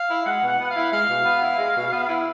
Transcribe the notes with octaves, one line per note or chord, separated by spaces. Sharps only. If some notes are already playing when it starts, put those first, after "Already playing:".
Already playing: F5
E4
G#3 F#5
B2
F#5
B3 F#5
F5
E4
G#3 F5
B2
B3
E4
G#3
B2
B3
E4